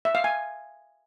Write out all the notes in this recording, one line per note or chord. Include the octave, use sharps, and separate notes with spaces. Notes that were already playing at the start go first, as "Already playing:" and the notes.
E5
F5
G#5